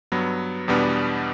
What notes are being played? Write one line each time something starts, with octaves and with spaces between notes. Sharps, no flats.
G2 F#3 B3
E2 B2 G3 B3 D4